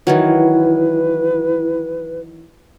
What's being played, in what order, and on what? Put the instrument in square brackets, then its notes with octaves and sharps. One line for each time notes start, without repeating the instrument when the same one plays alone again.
[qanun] D#3 E3 F#3 [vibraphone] E4 [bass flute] B4